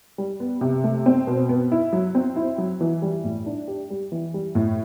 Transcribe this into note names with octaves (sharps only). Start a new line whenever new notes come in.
G3
B3
C3
A3
C4
B2
B3
E4
F#3
C4
E4
F#3
E3
G3
A2
D4
G4
G3
E3
G3
A2